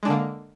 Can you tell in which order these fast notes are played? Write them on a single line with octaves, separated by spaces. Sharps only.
G#3 D4 D3 A#3